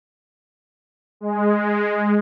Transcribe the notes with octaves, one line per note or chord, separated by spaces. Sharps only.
G#3